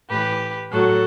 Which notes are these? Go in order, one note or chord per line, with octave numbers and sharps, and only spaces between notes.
A2 E3 G4 B4
A2 F#3 F#4 A4